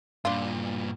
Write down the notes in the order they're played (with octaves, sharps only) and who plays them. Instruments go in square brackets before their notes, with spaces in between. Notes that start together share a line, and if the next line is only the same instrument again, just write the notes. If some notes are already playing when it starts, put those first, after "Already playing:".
[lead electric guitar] G2 A#2 [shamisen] D4 F4